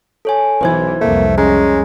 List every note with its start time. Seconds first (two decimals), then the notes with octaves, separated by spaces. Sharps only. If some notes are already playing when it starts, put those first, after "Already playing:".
0.25 A4 C#5 G#5
0.61 B1 E3 B4 C5 G#6
1.01 C2 F2 A3 A#3
1.38 G#3 C#4 A#5